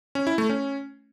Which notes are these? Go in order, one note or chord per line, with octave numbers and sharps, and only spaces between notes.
C#4
E4
A3
C#4